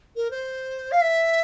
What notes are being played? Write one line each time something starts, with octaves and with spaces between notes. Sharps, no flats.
A#4
C5
F5
E5